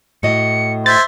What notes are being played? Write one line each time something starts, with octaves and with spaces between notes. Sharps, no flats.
A2 F#4 D#5 C#7
C5 E5 G#6 A6